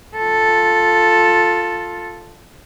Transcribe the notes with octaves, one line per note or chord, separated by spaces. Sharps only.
F4 A4